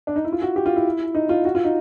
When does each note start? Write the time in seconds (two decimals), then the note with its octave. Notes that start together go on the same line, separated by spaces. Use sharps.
0.07 D4
0.16 D#4
0.25 E4
0.32 F4
0.42 F#4
0.56 G4
0.66 F4
0.76 E4
1.15 D#4
1.29 F4
1.45 F#4
1.55 F4
1.64 D#4